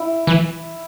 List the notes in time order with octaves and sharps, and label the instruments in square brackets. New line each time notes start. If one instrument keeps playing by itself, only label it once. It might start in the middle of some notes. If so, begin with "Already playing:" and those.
Already playing: [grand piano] E4
[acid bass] E3